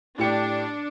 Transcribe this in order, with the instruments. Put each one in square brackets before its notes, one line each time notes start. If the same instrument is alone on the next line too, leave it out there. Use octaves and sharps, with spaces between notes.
[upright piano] A2 G4 C#7 [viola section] D4